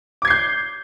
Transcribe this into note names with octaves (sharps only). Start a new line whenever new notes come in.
D6 G6 G#6 C7